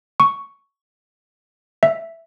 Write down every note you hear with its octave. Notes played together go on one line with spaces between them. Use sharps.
C#6
E5